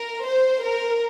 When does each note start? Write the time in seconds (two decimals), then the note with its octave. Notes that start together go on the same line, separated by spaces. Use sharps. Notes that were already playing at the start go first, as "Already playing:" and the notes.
Already playing: A#4
0.25 C5
0.63 A#4